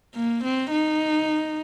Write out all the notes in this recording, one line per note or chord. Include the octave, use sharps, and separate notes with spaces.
A#3
C4
D#4